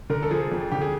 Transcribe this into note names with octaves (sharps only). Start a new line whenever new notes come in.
D3 A#4
A4
F3 G#4
F2
D3 G4
G#4